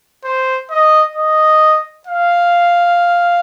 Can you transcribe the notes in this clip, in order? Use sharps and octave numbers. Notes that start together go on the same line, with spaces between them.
C5
D#5
D#5
F5